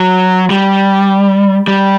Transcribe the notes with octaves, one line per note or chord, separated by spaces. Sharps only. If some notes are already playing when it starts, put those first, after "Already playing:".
Already playing: F#3
G3
G3